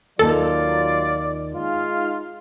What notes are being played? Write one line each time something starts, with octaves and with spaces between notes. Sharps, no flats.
D#2 F#3 D#4 F4 A4 D5
G#3 D#4 F4 F5